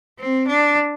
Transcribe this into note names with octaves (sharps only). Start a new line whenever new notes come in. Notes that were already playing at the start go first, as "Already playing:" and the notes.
C4
D4